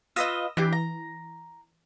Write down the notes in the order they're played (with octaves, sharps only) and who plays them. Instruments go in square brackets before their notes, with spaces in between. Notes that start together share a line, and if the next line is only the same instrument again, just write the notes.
[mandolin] F4 B4 D#5 [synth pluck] D#6 E6 A#6
[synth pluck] E3 [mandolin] D4 G4
[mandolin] A#5